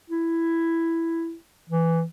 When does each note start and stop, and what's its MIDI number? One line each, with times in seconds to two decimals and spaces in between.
0.10 1.35 64
1.70 2.03 52